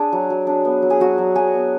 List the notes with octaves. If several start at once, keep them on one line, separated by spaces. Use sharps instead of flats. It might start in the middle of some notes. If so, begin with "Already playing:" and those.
Already playing: D4 G#4
F#3
F#3
D4
B3
F#3
G#4
F#3 F#4
F#3
F#3 G#4
B3